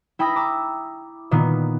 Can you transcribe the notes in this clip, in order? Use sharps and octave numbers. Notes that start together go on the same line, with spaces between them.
E4 G5 B5 D#6 A#6
A#5 D6 E6
A#2 D#3 B3